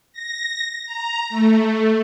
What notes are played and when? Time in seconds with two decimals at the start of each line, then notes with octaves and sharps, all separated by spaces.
0.13 A#6
0.86 A#5
1.30 A3